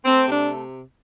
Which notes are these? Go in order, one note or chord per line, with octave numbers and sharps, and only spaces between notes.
A3 C4
C3 D4